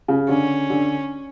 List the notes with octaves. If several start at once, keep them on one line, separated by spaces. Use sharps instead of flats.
C#3
D3 C#4
D3